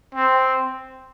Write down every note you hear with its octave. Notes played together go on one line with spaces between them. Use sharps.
C4